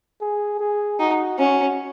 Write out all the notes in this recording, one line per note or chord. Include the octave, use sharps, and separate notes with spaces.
G#4
G#4
D#4 F#4
C#4 F#4